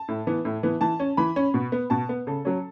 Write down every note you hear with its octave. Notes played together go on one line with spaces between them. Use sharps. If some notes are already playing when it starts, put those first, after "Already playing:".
Already playing: A5
A2
E3 B3
A2
E3 B3
E3 A5
C#4
E3 B5
C#4
B2
B3
B2 A5
B3
C#3 A4
F#3 C#4